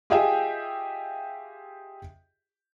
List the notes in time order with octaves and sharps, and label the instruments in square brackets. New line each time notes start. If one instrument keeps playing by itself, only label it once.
[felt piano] F4 G4 G#4 D#5 E5 G5